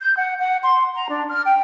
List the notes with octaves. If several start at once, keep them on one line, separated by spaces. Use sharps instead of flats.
G6
F#5
F#5
C6
A#5
D4
F6
G5